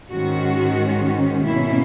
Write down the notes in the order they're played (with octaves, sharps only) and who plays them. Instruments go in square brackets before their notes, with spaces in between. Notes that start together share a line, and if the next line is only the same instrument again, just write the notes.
[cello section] G#2 D#3 G#3 C#4 F#4
B2 A#3 C#4 E4